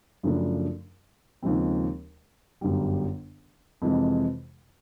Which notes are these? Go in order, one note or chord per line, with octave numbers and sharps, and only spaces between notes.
F#2 C#3 F3 A3 D4
D#2 C#3 F3 G#3 C4
G1 F#2 D3 G3
F2 C3 E3 G#3